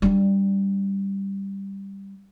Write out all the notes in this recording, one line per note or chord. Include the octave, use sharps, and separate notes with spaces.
G3 D4